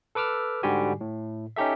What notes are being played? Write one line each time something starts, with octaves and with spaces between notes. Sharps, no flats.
A4 B4 D6 E6 F6
G#2 D3 G3 F#4 G4 G#5
A2
C#4 D#4 G4 A4 E5